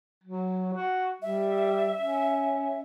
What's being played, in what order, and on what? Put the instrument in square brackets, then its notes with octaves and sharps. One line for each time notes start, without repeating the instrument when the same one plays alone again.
[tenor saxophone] F#3
F#4
[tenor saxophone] G3 [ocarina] E5
[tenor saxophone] C#4